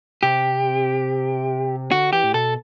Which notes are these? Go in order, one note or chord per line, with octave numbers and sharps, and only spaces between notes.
C3 G4
D3 F#4
E3 G4
A2
B2 A4